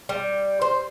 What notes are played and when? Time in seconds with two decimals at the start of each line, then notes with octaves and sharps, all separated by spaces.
0.09 G3
0.62 C5